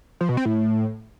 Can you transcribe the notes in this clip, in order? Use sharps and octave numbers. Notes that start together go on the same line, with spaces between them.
F3
B2
C4
A2